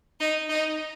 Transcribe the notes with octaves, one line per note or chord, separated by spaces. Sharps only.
D#4
D#4